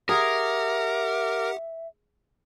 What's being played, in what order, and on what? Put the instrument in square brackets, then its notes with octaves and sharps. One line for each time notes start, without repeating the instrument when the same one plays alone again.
[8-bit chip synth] G4 F#5 D6 [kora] G#4 [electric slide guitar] A#4 [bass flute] E5